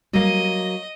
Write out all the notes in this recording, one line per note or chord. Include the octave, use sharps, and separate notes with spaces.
F#3 G3 A#3 D#5